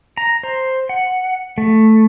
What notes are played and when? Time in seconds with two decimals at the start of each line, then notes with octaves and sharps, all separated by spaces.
0.17 A#5
0.43 C5
0.89 F#5
1.58 A3